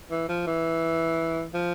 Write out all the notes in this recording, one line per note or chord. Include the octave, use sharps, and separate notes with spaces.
E3
F3
E3
F3